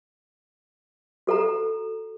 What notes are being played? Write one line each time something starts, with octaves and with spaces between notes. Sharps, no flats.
F#4 A4 F#5 A#5